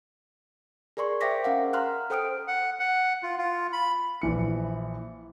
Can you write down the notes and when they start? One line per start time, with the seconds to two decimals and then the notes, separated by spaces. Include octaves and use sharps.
0.97 G#4 A#4 D5 C6 C#6
1.21 C5 E5 G5 D6 A#6 B6
1.44 C#4 A#4 F5 F#5
1.73 A#5 C6 F6 F#6
2.10 A4 C5 G5 D#6 F6 D7
2.48 F#5
2.80 F#5
3.23 F4
3.38 F4
3.73 B5
4.22 A#1 E3 C#7